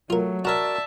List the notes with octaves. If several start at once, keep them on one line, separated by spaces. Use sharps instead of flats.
F#3 A3 F4 A#4
F#4 A#4 C#5 D5 E5 A5 A#5